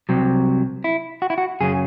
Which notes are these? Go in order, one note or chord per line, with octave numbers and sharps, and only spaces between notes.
C2 C3 F#3
E4
F#4
E4
F#4
F#2 C#3 F#3 C#4 G#4